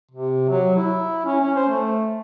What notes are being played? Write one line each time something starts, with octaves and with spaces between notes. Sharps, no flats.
C3
F#3
E4
C#4
C#4
C5
A3